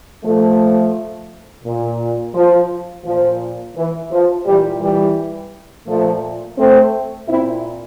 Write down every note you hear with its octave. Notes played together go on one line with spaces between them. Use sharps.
A#2 F3 A3
A#2
F3
A#2 F3
E3
F3
A#2 E3 G3
E3 G3
A#2 F3 A3
A3 C4
A#2 C4 E4